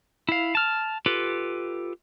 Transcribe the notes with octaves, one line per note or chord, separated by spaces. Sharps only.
E4 F5
A5 F6
F4 G4 A4 B4